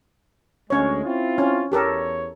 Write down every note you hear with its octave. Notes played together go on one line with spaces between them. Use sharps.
D2 G#3 C#4 C#5
C4 E4 F4
C#4
E2 G4 A4 A#4 C#5